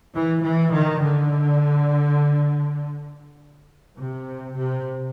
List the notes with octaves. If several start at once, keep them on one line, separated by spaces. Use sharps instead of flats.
E3
E3
D#3
D3
C3
C3